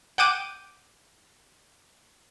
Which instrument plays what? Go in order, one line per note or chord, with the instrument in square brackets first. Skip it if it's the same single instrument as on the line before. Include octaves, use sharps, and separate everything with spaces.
[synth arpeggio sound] F#5 G5 D6 D#7